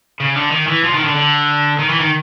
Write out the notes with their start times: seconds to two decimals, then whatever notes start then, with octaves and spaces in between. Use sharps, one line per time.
0.20 C#3
0.36 D3
0.51 D#3
0.67 E3
0.84 F3
0.94 D#3
1.04 D3
1.15 D3
1.79 D#3
1.89 E3
2.00 D#3